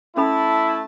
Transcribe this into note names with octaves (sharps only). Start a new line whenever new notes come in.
A3 C#4 E4 A4 A5 B5